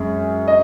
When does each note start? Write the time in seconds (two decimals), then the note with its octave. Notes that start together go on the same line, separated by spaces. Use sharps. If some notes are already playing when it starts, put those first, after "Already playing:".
Already playing: F#2 G#3 C#4 G#4
0.48 D#5